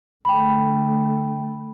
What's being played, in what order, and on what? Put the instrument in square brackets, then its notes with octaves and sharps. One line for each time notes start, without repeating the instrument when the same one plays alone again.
[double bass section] D3 A3 [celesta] G5 B5